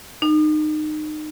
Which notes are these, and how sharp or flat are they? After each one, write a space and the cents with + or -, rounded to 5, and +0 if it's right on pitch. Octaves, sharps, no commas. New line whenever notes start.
D#4 -25